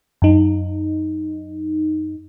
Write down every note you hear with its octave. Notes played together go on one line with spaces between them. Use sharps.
F#2 D#4